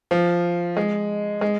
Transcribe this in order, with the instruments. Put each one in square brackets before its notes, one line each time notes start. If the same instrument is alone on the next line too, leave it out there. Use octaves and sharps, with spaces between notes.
[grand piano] F3
G#3
G#3